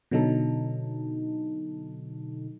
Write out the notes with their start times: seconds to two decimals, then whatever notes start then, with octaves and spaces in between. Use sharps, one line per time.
0.11 B2 D3 F#3 D#4 A4